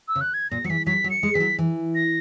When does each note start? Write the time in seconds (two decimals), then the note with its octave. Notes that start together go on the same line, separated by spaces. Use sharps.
0.08 E6
0.16 C#3
0.21 F#6
0.34 G#6
0.51 A#2 A#6
0.64 F#3 C#7
0.70 E3 B6
0.86 F#3 B6
1.04 F#3
1.10 C#7
1.23 G#3
1.34 E3 B6
1.40 F#3
1.59 E3
1.95 A#6